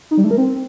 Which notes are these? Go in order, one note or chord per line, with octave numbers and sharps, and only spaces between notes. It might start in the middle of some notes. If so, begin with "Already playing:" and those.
D#4
G3
A3
A#4
C4